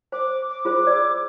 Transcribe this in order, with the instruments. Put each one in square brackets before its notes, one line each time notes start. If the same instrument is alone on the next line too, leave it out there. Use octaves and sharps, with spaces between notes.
[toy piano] C5 [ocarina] D6
[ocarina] D6
[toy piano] F4 G#4 C5
D5 E6